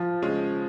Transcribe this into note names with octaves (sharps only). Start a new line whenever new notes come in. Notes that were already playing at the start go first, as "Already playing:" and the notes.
Already playing: F3
C#3 G#3 C#4